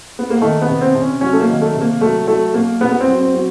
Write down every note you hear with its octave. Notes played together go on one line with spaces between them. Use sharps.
B3
A#3
D#3 A3
B3
C3
C4
C3
C#4
F#3 C#4
A3
A#3
D#3
A3
C3
A#3
F#3 A3
F#3 A3
B2 A#3
B2 B3
B3
C4
F#3
C4
F#3